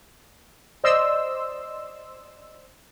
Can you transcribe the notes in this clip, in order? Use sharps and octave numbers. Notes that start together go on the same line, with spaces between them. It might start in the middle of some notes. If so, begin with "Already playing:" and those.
C5 D5 D#5 C6 E6